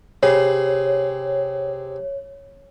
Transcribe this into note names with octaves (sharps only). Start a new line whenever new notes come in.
C3 G#4 C#5